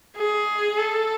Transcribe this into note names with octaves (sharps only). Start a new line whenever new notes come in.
G#4
A4